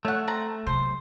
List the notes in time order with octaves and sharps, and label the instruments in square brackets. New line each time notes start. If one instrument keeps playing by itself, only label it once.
[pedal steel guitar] A3 [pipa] C#4 F#5
[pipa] C4 A5 A#5
[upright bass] C3 F#3 [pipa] C5